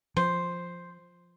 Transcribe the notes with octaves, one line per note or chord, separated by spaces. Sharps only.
F3 C5